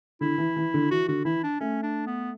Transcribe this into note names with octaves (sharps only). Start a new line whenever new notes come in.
D3 E4
E3
E3
D3
E3 F#4
D3 F#4
E3 E4
D4
A3 C#4
D4
B3